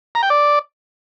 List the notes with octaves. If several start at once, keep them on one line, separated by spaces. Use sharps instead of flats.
A#5
G5
D5